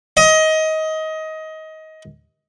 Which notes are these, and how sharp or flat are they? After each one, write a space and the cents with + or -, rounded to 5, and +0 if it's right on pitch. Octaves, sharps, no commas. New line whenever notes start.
D#5 +20